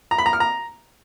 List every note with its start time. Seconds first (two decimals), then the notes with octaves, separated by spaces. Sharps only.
0.11 A#5
0.18 B5
0.26 A#5
0.33 F6
0.40 A#5